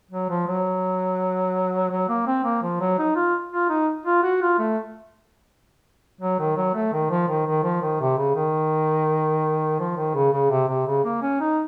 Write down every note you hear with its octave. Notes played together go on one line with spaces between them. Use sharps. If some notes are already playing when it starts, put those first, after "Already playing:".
F#3
F3
F#3
F#3
A#3
C4
A#3
F3
F#3
D#4
F4
F4
D#4
F4
F#4
F4
A3
F#3
D#3
F#3
A3
D#3
F3
D#3
D#3
F3
D#3
C3
C#3
D#3
F3
D#3
C#3
C#3
C3
C3
C#3
A#3
C#4
D#4